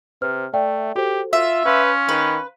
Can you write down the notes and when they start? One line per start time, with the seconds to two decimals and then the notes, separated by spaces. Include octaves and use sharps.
0.22 C3 B4 C5 F6
0.54 A3 D5 E5 G5
0.95 F#4 G4 A4 C5
1.33 F4 E5
1.66 C#4 B4 F5 C6
2.09 D#3 B4